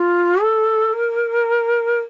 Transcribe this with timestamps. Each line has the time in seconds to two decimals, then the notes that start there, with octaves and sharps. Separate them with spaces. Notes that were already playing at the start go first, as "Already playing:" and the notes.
Already playing: F4
0.41 A4
0.93 A#4